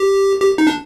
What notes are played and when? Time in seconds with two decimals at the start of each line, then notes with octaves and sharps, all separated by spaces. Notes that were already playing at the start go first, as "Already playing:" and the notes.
Already playing: G4
0.40 G4
0.58 D#4
0.67 D4